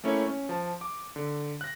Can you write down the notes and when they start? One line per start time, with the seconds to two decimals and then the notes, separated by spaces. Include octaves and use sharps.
0.04 A3 A#3 C#4 E4 C#5
0.28 C#4
0.49 F3 A5
0.81 D6
1.16 D3
1.61 F#6 A#6